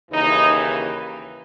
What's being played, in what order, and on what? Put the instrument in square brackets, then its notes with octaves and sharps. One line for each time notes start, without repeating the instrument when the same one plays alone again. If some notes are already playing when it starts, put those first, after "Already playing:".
[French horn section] D#2 C#3 E3 D#4